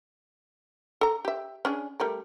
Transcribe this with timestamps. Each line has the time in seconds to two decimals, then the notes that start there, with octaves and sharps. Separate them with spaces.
1.01 A4 A#5
1.25 G4 E5
1.65 C#4 D4 G#4
2.00 G3 A3 A#4